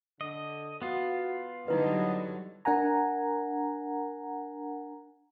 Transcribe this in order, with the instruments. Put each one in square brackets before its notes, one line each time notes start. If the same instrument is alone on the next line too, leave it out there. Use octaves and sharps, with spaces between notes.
[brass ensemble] D3 [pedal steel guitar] D#5
[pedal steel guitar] B3 F4 [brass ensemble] F#4
[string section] D3 F#3 G3 [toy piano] D#4 E4 B4 [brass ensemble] D#5
[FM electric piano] D4 A#4 F#5 G#5 A#5